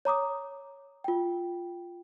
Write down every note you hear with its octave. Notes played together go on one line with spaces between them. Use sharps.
C#5 A#5 D6 D#6
F4 G5